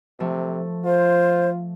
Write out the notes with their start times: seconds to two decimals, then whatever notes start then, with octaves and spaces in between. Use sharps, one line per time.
0.20 C3 F3 A3
0.85 F4 C5